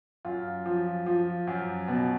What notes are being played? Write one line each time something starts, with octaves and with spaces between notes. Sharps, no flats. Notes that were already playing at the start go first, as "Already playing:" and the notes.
F#2 F4
F3
F3
F#2
B2